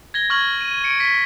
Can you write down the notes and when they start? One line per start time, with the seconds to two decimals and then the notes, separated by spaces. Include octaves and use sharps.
0.14 G#6 A#6 G7
0.30 C#6 F6 G#6 F#7
0.61 D#7
0.84 C#7 D7
1.00 B6